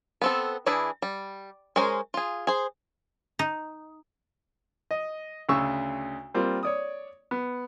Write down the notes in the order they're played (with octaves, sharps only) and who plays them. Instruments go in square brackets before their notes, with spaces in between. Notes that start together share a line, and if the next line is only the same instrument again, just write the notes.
[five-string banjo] B3 C4 A4
E3 D4 E4 G#4 B5
G3
G#3 C#4 A#4 C5
F4 G#4
G#4 C5
[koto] D#4
[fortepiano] D#5
D2 C#3 C#6 E6
G3 A#3 C4 F4
C#5 D5 D#6
B3